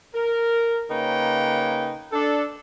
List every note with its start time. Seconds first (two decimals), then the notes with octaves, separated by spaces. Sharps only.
0.14 A#4
0.90 C#3 A#3 D#4 B4 C#5 G5
2.13 D4 A4